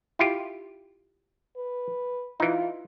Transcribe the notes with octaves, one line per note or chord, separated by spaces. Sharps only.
E4 F4 G4
B4
E3 D#4 F4